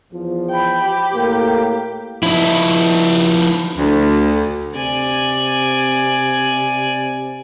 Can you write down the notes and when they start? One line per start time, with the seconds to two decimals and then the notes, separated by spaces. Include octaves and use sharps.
0.12 E2 F3
0.50 G5 B5
0.84 G4
1.13 A2 A#3
2.23 F3 D#4 E4
3.78 D2
4.75 C3 D5 G#5